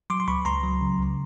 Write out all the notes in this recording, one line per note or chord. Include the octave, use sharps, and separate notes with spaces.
F#3 C6 D6
C6
C#2 B5 C#6
C#2 A#5 C6
F#3
C#3
C#2